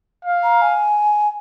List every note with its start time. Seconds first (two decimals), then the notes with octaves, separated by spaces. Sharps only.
0.25 F5
0.43 A#5
0.62 G#5